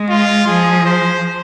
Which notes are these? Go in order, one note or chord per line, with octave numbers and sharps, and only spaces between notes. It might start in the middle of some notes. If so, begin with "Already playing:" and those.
Already playing: G#3
F4
F3 G#4
C5